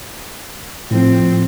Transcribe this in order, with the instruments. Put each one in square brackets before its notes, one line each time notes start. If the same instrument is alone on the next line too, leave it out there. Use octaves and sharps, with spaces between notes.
[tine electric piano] A2 F3 [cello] C4